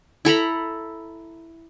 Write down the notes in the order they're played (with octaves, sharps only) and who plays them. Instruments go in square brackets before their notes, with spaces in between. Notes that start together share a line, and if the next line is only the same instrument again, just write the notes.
[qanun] E4 A4 A#5 B5